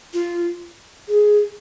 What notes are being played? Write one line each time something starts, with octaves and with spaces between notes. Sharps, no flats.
F4
G#4